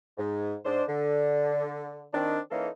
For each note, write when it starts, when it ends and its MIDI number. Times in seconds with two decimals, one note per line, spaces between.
0.18 0.56 44
0.65 0.83 44
0.65 0.83 62
0.65 0.83 72
0.88 2.06 50
2.14 2.38 51
2.14 2.38 60
2.14 2.38 62
2.51 2.67 52
2.51 2.67 58
2.51 2.67 61
2.51 2.67 63
2.51 2.67 69